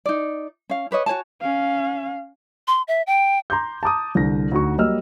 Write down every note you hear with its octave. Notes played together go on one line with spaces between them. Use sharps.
D#4 D5
C#4 F5
G4 B4 C#5 D#5
F#4 C#5 G#5 A5
C#4 F5
C6
E5
G5
A#5 C6 D6 G6
A5 A#5 D6 D#6
C2 D3 A#6
D2 D#4 F#4 C#6
F#3 G3 A#3 D#5 E6 F6